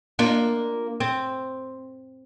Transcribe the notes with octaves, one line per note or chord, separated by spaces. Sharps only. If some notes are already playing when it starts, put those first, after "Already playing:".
A#3 D4 F4
C4